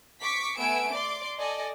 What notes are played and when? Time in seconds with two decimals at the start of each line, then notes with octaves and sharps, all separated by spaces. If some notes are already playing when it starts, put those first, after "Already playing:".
0.21 C#6 D6 B6
0.56 A3 B3 G#5 E6 D7
0.91 D5 C6 D6
1.39 A4 D5 D#5 G#5